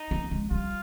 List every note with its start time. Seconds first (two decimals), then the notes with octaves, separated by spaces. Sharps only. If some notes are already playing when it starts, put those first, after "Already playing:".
Already playing: D#4
0.11 A#3
0.31 G#3
0.51 G3 F4